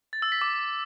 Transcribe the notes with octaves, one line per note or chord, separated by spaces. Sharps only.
A6
E6
B6
D6